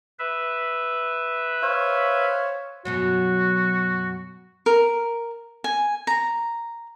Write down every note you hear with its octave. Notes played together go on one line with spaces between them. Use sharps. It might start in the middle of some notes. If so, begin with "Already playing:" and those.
B4 E5
C5 C#5 F5
F#2 B2 F#3 F#4
A#4
G#5
A#5